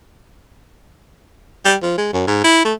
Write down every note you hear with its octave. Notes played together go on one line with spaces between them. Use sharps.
G3
F3
G#3
F#2
G#2
E4
A3